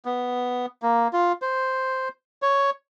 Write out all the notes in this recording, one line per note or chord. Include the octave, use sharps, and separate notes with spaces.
B3
A#3
F4
C5
C#5